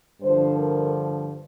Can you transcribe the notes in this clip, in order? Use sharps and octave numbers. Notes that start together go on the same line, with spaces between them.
G2 D3 F3 C5
A#4